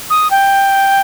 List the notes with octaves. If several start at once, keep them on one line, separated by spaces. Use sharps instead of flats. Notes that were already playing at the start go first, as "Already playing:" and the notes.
D#6
G5